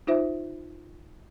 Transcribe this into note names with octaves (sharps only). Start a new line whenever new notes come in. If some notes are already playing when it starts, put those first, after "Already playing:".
D#4 F4 C5 E5